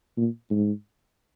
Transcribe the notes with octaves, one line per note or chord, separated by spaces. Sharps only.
A#2
G#2